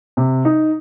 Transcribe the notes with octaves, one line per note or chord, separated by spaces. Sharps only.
C3
D#4